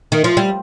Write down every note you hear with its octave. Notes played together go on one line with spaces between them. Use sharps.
D#3
F3
G3